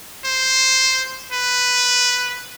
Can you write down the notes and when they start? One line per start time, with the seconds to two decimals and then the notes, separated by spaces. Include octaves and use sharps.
0.25 C5
1.32 B4